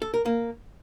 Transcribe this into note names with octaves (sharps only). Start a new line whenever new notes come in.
A4
A#4
A#3